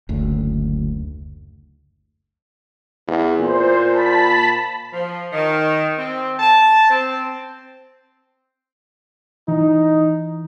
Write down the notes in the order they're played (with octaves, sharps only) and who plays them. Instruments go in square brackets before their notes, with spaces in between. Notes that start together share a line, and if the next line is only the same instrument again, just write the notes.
[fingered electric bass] F#1 D2
[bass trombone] E2
[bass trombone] A#2 [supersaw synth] C5
[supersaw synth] A5 B5 B6
[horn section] F3
D#3
C4
A5
C4
[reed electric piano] E3 [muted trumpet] D#4